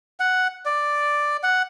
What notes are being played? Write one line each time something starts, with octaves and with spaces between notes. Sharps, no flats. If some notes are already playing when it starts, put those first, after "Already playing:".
F#5
D5
F#5